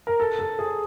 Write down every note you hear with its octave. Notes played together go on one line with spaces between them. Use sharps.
A#4
A4
A4
G#4